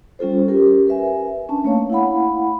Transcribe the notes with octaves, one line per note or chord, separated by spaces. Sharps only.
G3 C#4 F4 A4 C5
C#4 G4 A#4
A#4 B4 E5 G#5
C#4 D4 A5
A3 A#3 C#5 F5
E4 F5 F#5 B5